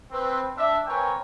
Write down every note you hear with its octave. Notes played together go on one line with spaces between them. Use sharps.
C4 B4
D4 E5
C4 A#4 B4 C#5 G5 G#5